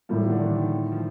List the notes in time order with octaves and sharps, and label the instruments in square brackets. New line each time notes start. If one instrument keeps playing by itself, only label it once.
[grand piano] A2 G3 A#3 [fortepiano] F3
[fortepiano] D#3
D3
D#3
D#3
F3